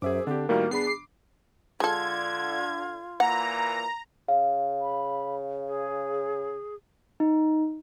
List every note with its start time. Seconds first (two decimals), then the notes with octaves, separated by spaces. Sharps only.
0.02 F#2 G#4 C5 E5 D6
0.27 D3 C4 D4 G4
0.49 A2 D#3 G3 A#3 F#4
0.71 B3 D4 G#4 B5 C7
0.87 D6
1.80 D3 G#3 F4 A4 G#6
3.20 A#2 E3 A#3 F#5 A#5
4.28 C#3 F5
4.82 B5
5.67 G#4
7.20 D#4